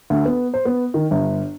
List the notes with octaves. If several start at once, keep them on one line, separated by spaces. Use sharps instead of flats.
D2
B3
C5
B3
D#3
G1